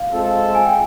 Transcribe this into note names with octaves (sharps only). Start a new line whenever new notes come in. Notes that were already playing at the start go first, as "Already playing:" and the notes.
Already playing: F5
G#3 C4 F4 A4
G#5
G5